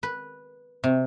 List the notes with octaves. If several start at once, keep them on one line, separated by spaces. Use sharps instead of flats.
B4
C3